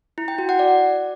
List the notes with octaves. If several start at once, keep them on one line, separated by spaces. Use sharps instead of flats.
E4
G5
F#4
F#5
D5